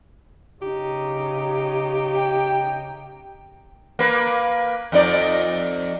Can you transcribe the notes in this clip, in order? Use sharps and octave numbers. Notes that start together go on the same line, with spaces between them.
C#3 D#4 G4
G5
A#3 B4
F2 D#4 D5